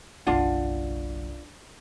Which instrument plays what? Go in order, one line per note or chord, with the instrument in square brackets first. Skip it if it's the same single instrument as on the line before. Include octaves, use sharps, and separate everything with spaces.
[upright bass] F#1 B1 [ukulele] D4 F4 F#5